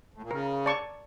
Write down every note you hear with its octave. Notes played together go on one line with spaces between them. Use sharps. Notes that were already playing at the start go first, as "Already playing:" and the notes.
A2
A#2
C#3 A#4
D5 A5 C#6